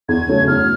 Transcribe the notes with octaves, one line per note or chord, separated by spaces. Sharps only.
E2 G#6
C#3 F#3 A3
E2 F6